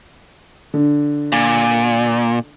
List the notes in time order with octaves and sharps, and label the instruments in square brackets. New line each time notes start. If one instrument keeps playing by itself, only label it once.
[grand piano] D3
[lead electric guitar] A#2